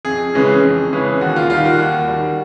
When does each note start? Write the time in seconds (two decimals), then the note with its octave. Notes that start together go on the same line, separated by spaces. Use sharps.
0.05 F2 G#4
0.34 C#3 E3 G#3 C#4
0.63 F2
0.92 C#3 E3 G#3 C#4
1.21 D#2 F#4
1.36 F4
1.50 D#3 G3 F4
1.64 F#4
1.79 D#2
2.08 D#3 G3